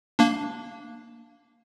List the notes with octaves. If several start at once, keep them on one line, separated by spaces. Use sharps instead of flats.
A#3 D4